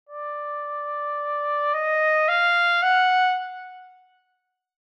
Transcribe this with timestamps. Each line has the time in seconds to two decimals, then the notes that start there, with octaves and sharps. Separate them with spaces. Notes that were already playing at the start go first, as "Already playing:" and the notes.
0.09 D5
1.74 D#5
2.28 F5
2.83 F#5